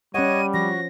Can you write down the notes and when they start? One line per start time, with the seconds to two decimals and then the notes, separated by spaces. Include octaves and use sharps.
0.14 G3 C#4 C#5 D#5 F#5 D#7
0.54 F3 F#4 A#6